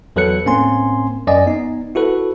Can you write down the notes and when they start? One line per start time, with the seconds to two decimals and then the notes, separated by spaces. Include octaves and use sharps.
0.16 E2 F#3 A4 B4 F#6 C#7
0.46 A2 A#3 C4 C#4 G#5 C6
1.27 F#2 D5 D#5 G#5
1.46 B3 D#4
1.95 E4 F#4 A4 B4